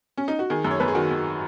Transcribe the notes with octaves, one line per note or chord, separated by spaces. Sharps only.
C#4
D#4
F#4
D#3 G#4
F#2
C#5
F#2 B4
G#4
D#3 F#4
D#3